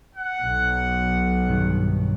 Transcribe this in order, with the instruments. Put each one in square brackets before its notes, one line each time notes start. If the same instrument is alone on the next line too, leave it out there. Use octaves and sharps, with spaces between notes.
[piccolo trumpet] F#5
[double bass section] B1
[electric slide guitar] G2 D#3